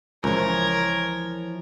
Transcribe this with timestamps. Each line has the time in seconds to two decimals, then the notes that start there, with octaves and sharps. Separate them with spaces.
0.24 C#2 E3 F3 A#4 C#5